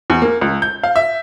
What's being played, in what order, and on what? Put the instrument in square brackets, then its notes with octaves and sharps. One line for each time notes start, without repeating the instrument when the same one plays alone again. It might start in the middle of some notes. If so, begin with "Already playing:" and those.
[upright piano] E2
A#3
C#2
G6
F5
E5